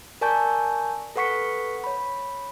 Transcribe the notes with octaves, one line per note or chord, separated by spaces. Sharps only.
A#4 D5 G#5 A5 C#6 G6
A4 B4 F#5 C#6 B6 C#7
C#5 B5